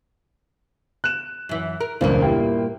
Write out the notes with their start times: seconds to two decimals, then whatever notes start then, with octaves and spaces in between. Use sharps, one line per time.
1.04 F#6 E7
1.49 F#2 E3
1.80 A#4
2.01 E1 C#2 G2 A#2 A#3 C5
2.22 E4 G4 G5